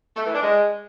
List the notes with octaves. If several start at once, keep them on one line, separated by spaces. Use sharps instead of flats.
A3
E3
D4
G#3